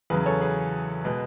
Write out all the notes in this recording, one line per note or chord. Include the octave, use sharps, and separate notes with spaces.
E2 C#3 F#3 G#4 B4
A4 C#5
G#4 B4
B2 G#3